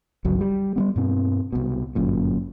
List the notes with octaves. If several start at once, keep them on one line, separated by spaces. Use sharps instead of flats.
G1 C#2 F#3
G3
G3 A#3 B3
G2 B2 C4
C2 B2
G1 F#2 A#2